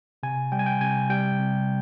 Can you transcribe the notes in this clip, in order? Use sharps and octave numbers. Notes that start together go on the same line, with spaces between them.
C3 G#5
G3 G5
G#5
G5
C3 G#5
G3 G5
C3